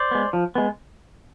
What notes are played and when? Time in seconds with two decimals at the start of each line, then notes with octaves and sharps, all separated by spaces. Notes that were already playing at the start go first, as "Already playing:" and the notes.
Already playing: C5 D5
0.11 G#3 B3
0.33 F3
0.55 G#3 B3